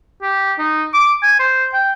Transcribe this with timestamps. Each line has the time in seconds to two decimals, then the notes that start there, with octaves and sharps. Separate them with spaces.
0.22 G4
0.59 D#4
0.94 D6
1.23 G#5
1.39 C5
1.73 G5